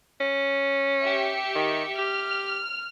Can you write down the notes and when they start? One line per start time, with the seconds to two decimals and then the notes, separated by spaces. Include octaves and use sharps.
0.21 C#4
1.02 G4 E5 C#7
1.55 D#3
1.98 G4 F6